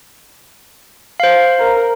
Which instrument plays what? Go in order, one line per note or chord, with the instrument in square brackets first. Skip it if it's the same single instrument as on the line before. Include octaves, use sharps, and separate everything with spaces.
[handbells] C5 F5
[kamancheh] A#4